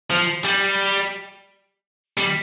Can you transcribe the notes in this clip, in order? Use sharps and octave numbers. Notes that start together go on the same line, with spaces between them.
F3
G3
G3